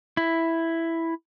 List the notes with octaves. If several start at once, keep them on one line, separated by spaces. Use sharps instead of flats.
E4